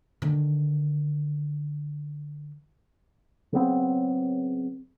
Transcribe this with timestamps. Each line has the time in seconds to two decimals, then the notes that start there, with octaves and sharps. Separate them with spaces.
0.22 D3 D#3
3.53 C#3 F#3 B3 C4